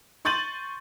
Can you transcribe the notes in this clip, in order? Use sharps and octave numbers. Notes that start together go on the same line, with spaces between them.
C6 C#6 G6 A6 D#7 F#7